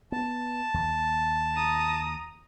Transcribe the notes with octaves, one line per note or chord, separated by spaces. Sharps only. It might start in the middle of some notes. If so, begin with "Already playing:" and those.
B3 A5
D#2
A#5 D#6